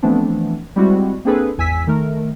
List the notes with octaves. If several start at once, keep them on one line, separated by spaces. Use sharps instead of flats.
E3 F3 A3 B3 C4 D4
G3 G#3 C4 E4 F#4
A#3 C4 D4 G#4 A4 B4
G#1 E2 G#5 E6 B6
D#3 A3 A#4